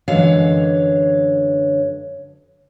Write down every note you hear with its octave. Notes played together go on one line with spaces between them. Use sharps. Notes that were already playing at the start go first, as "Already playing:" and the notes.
F#2 D3 E3 G#3 C#5 F5